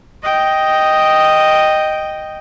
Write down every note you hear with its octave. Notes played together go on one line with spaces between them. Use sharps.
D#5 G5